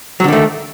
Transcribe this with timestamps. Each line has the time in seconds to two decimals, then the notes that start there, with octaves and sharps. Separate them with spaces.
0.20 F#3
0.24 D3
0.28 D#3
0.33 A3